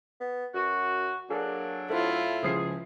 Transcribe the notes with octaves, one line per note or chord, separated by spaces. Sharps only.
B3
F#2 F#4
F#3 A#3 D4 G#4 A4
A2 E4 F4 A4 C5
C#2 F3 G#4 C7